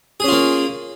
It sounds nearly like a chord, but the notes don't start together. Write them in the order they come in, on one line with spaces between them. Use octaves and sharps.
G#4 C#4 F4 A#3